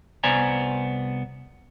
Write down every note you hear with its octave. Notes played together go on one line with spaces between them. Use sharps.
C2 B3 C5 D5 G#5 A#5